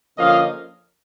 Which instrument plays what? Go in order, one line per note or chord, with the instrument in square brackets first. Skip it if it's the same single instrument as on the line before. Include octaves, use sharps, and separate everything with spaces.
[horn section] D3 F3 A#3 C#4 D#5 F5